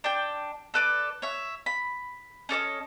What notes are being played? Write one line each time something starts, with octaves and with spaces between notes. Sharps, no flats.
D4 G5
A4 B4 D5
C#5 E5
B5
C#4 A4 D5 D#5